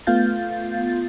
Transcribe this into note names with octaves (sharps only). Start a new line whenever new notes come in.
A3 B3 F4 F5 G6 A6